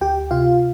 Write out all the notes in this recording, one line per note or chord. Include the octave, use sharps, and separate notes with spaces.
D2 G4 G5
C3 F4 F5